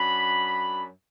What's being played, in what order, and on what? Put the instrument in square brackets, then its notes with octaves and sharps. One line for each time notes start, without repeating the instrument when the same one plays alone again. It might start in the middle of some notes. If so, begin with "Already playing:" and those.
Already playing: [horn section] F#2 F#3 D4 B5